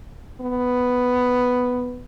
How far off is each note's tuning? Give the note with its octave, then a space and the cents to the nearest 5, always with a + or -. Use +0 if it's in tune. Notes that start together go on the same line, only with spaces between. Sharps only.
B3 +5